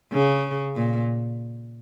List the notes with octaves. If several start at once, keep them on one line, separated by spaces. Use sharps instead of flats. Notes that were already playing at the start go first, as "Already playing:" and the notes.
C#3
A#2